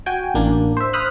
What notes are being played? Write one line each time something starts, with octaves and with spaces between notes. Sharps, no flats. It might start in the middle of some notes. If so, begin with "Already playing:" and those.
F#4 G5 G#5
A1 A#3 D4
C5 E5
C5 B5 D#6 F6 F#6